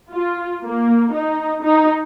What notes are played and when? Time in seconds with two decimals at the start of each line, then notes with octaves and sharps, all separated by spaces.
0.12 F4
0.65 A#3
1.14 D#4
1.64 D#4